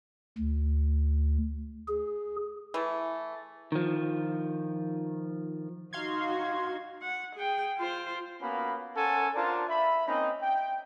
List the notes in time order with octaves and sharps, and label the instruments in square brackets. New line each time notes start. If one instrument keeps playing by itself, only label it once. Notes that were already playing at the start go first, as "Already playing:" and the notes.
[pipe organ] D2
G#4
[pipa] E3 A3
[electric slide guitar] D#3 F3
[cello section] D#4 F#4 [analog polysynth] F5 C6 G#6
[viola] F#5
G#4 G5
F4 C5
[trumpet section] A#3 B3 C#4 F#4 F5 B5
C#4 A4 A#4 C5 F#5 G#5
D4 F4 A#4 C5 D5 A5
E5 B5
A#3 C4 C#4 D#4
G5